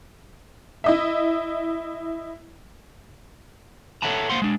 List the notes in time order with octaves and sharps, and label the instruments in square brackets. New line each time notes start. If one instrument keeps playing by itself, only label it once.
[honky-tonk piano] E4 D#5 E5
[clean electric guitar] A4 C#5 E5 F#5 A5 A#5
A#3 C5 F5 F#5 C6
G#3 D4